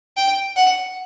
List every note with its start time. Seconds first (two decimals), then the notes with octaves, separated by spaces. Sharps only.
0.17 G5
0.56 F#5